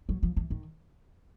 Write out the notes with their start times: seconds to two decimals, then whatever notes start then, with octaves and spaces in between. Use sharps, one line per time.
0.09 F#3
0.23 F3
0.37 E3
0.50 D#3